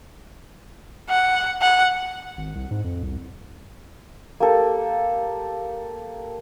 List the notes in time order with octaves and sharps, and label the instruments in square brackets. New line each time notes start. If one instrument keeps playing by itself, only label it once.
[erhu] F#5
F#5
[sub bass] G#1
C2
G#2
F2
C2
[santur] A#3 G4 A4